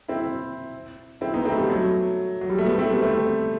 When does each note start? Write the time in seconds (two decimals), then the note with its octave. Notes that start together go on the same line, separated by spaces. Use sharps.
0.08 C4 E4
1.21 C4 E4
1.34 B3 D#4
1.46 A3 C4
1.58 G3 B3
1.70 F#3 A3
2.41 F#3
2.50 G3
2.58 A3
2.66 G3 B3
2.78 A3 C4
2.91 G3 B3
3.02 A3 C4